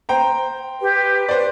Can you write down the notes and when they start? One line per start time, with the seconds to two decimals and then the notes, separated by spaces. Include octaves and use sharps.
0.09 C5 G5 A#5
0.80 G4 B4
1.29 C5 D5